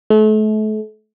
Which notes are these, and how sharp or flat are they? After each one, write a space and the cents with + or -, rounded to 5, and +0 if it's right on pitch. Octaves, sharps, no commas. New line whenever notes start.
A3 -35